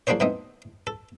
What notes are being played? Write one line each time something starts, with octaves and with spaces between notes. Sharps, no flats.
F3 A#3 D4 G#4 C5 C#5
B2 A3 C4 D#4 D#5
A4